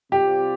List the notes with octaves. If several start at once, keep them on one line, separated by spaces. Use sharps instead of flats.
C3 G3 C4 F4 G4 D5